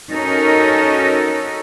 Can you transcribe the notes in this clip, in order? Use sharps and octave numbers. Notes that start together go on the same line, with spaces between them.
C#4 D#4 F#4 A4 A#4